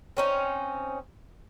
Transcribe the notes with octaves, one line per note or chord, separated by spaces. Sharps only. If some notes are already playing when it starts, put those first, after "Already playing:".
C4 C#4 D#4